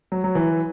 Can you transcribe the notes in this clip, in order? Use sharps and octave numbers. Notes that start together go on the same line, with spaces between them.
F#3
F#3
E3